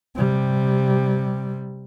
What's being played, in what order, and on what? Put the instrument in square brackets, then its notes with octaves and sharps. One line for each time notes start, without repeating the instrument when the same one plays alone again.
[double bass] C3 G3